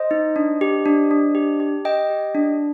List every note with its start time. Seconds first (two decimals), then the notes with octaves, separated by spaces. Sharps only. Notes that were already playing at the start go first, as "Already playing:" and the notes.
Already playing: C5 D#5
0.11 D#4
0.36 D4
0.61 G4
0.86 D4
1.11 D4
1.35 G4
1.60 G4
1.85 G4 D#5 G5
2.10 G4
2.35 D4